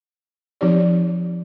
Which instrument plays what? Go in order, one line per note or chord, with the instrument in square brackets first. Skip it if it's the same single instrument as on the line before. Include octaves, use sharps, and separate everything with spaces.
[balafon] F3 C4 D#4 G4 D5